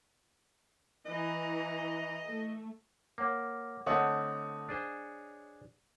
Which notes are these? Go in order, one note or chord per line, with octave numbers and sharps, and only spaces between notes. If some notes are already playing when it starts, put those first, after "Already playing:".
E3 D#5 A#5
A3
A#3 C#5 F#5 D6
D3 A3 C4 C#5 D#5 F#5 D#6
D4 G#4 C5